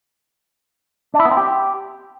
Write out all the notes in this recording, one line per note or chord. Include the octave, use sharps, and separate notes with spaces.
D4
E4
B3
C4
G4